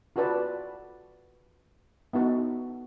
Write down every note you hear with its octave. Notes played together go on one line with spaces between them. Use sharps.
F4 F#4 A4 B4 D5 A5
B3 D#4 F#4 A4